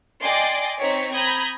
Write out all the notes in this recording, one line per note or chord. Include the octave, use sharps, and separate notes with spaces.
D5 D#5 G5 G#5 C6 D6
C4 D#4 C#5 B6
A#5 B5 D#6 G6 G#6